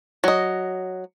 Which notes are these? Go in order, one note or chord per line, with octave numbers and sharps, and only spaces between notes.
F#3 D#5